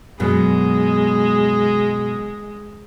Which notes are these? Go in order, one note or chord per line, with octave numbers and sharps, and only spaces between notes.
F#2 B2 G#3